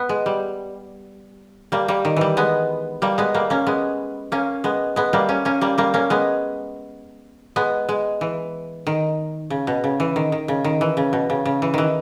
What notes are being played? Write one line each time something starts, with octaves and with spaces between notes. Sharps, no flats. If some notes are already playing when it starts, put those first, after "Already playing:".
Already playing: B3
G#3
G3
G3 A#3
G3 A#3
D#3
E3 G3
G#3 B3
G3 A#3
G#3 B3
G3 A#3
A#3 C#4
G#3 B3
A#3 C#4
G#3 B3
G#3 B3
G3 A#3
A#3 C#4
A#3 C#4
G3 A#3
G3 A#3
A#3 C#4
G#3 B3
G#3 B3
G#3
E3
D#3
C#3
B2
C#3
E3
D#3
D#3
C#3
D#3
E3
C#3
B2
C#3
C#3
E3
D#3 E3